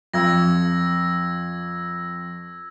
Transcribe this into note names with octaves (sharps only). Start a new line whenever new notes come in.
F2 E6 G#6 A#6